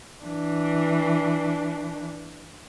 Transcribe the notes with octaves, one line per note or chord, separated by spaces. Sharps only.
E3 D4